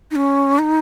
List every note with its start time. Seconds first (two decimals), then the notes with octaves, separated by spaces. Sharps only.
0.11 D#4
0.16 C#4
0.59 D#4